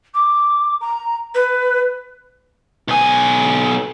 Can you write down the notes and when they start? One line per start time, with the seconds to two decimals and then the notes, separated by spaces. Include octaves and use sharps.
0.14 D6
0.81 A#5
1.35 B4
2.88 B1 G#5